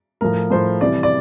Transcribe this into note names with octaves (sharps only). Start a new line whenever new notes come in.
A2 F3 A#4
A2 F3 C5
C3 E3 G3 D5
D5